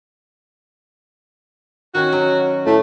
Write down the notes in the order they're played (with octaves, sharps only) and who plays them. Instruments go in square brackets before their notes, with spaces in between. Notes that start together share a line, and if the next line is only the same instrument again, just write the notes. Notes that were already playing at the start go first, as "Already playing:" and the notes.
[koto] D#3 C#4 [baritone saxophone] F#4
[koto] F#3
[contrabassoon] A2 [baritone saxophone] A3